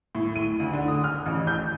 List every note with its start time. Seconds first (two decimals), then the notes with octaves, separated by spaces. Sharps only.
0.15 A2
0.36 D#7
0.60 D2
0.73 D3
0.88 D#6
1.04 F6
1.26 A1
1.47 G6